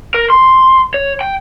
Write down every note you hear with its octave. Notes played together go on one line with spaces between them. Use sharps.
A#4
C6
C#5
G5